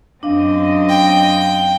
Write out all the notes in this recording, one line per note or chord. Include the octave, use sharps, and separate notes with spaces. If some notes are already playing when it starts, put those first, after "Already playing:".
F#2 C4 D4 D#5 F5
G5